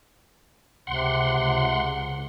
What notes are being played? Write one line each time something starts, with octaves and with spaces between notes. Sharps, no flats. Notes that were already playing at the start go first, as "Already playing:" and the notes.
C#2 C3 F#5 C6